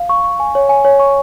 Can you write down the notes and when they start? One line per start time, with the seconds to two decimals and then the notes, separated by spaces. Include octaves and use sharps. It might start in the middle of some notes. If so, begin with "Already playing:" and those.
Already playing: F5
0.09 C#6
0.24 C#6
0.40 G#5
0.55 C#5
0.69 G#5
0.85 C#5
1.00 C#6